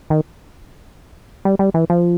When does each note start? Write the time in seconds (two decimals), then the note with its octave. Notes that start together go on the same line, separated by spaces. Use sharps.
0.10 D#3
1.45 G3
1.59 G3
1.74 E3
1.90 F3